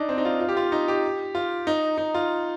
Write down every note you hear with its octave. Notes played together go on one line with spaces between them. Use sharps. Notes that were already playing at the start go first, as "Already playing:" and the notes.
Already playing: D4 D#4
C4
D#4
F4
F4
G4
F4
D#4
G4
F4
D#4
D#4
F4